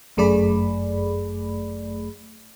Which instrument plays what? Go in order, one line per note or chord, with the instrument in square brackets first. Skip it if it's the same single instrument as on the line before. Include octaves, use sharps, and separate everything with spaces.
[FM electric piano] G1 F#2 A3 G#4 D5 B5